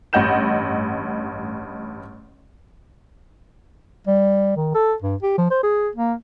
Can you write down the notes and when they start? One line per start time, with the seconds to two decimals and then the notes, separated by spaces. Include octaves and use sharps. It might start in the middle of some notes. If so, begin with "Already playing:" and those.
0.13 A1 G2 D#5 F#5 G6 E7
4.07 G3
4.56 D#3
4.75 A4
5.02 G2
5.22 G4
5.38 F3
5.51 C5
5.63 G#4
5.96 A#3